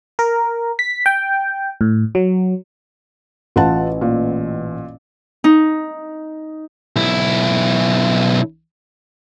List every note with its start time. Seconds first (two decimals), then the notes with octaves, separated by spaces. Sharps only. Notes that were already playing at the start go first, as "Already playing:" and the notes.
0.19 A#4
0.79 B6
1.06 G5
1.81 A2
2.15 F#3
3.56 A1 F4 F#5 A5
4.01 A#2
5.44 D#4
6.96 B1 E4